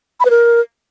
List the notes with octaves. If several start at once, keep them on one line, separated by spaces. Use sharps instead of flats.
B5
B4
A#4